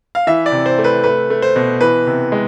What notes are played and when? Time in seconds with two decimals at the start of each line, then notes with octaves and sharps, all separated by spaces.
0.15 F5
0.27 E3 E5
0.46 D5
0.52 C3
0.66 C5
0.78 A3
0.84 B4
1.04 A3 B4
1.30 A3
1.42 C5
1.56 B2
1.81 E3 B4
2.07 C3
2.32 G#3